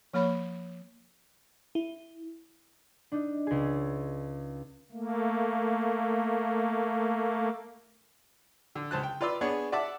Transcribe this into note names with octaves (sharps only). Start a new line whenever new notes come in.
F3 A#3 C#5 B5
E4
D4 D#4
C#2 G#4
A3 A#3
D3
C#2 C5 A5 F#6
G5
F4 B4 D5 C6 E6
B3 D4 G#4 C#5
D5 E5 F#5 A5 D6 E6